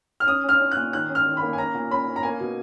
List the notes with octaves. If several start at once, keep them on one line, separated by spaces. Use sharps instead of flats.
F6
C#4 D#6
C#4 F6
C#4
F#6
A#2
D#3 F#6
C#4
F6
D#3
B5
A#3
G#5
C#4 A#5
A#2
C#4 B5
C#4
A#5
A#3 G#5
B2